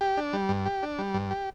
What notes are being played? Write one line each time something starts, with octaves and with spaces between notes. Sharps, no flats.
G4
D4
G3
G2
G4
D4
G3
G2
G4